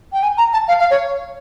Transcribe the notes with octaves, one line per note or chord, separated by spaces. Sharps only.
G5
G#5
A#5
A5
F5
F5
C#5